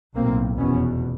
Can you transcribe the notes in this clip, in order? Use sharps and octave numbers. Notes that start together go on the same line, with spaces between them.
B1 A2 A#3 C4
F1 E2 B2 B3 C#4